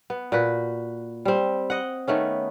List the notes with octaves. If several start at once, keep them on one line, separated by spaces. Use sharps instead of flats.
B3
A#2 F#4 B4
G3 C4
D#5 F#5
D#3 A3 B3 C#4